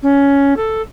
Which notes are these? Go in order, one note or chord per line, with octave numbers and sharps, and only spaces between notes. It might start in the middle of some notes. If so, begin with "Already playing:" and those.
C#4
A4